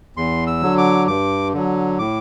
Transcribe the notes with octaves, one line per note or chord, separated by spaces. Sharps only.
E2 C6
E6
D3 F#3
D6
G2 D6
D3 F#3
A2 D6